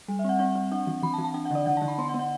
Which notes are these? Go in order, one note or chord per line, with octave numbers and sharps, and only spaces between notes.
G3
E5
C4 F#5
C4 F#5
C4
D4 F#5
E3
E3 B5
A5
E3
A5
D4 G5
F#5
D3 D5
D3 F#5
A5
D3
B5
B3 C6
F#5
B3
F#5